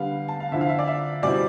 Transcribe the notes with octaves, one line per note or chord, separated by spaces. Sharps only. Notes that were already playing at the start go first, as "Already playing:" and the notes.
Already playing: D3 G3 B3 F5
A5
F5
D3 F3 C4 E4 E5
F5
E5
D5
E5
B2 G3 C4 E4 D5